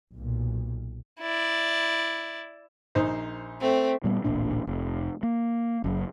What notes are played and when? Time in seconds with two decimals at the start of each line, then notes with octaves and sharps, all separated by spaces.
0.14 B1 A#2
1.21 E4 D5
2.95 A#1 D#4 C5
3.60 A3 C4
4.04 A#2 G3 B3
4.24 D1 A1 A#2 D4
4.67 F1
5.23 A#3
5.84 F#1 F#2